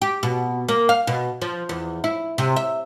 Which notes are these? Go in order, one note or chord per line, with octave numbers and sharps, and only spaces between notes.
G4
B2
A#3
F5
B2
F3
E2
E4
C3
E5